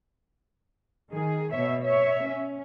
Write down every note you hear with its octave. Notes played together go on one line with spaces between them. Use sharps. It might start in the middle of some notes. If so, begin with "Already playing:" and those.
D#3 G#4
B2 C#5 E5
C#5 E5
C#4